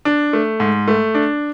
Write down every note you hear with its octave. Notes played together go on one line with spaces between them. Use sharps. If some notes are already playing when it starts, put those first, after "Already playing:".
D4
A3
G#2
A3
D4